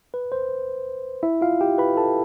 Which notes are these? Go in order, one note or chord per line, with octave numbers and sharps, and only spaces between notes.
B4
C5
E4 E5
F4 F5
G4 G5
B4 B5
A4 A5